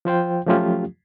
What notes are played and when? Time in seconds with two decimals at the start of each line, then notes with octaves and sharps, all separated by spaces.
0.05 F3 F4 C5 G5
0.46 F3 F#3 A3 C#4 F4 G4